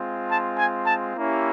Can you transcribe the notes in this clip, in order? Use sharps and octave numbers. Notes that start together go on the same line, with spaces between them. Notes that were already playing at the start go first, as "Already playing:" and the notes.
Already playing: G#3 C4 F4
A5
G#5
A5
A#3 C#4 E4 G4